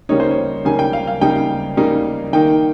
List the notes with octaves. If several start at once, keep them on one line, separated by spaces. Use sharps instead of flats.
C#3 G3 A#3 D#4 C#5
C5
C#5
C#3 G3 A#3 D#4 G#5
G5
F5
F5
C#3 G3 A#3 D#4 G5
C#3 G3 A#3 D#4
D#3 A#3 D#4 G5